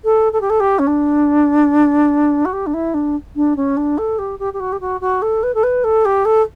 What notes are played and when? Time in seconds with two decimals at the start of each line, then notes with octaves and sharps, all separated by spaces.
0.04 A4
0.33 A4
0.41 G4
0.50 A4
0.60 G4
0.79 C#4
0.87 D4
2.45 F#4
2.53 G4
2.66 D4
2.74 E4
2.94 D4
3.36 D4
3.56 C#4
3.77 D4
3.98 A4
4.18 G4
4.39 G4
4.53 G4
4.60 F#4
4.72 G4
4.80 F#4
5.01 F#4
5.22 A4
5.43 B4
5.54 A4
5.63 B4
5.84 A4
6.05 G4
6.25 A4